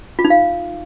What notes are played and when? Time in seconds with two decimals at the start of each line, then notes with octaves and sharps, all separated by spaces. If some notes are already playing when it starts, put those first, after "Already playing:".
0.19 F4
0.25 D#4
0.30 F5